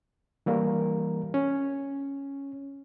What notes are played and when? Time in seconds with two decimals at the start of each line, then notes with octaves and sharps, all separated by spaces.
0.46 E3 G3 A#3 A#4
1.34 C#4